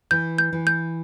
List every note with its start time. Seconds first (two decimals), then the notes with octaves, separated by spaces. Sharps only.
0.11 E3 G6
0.38 G6
0.53 E3
0.67 G6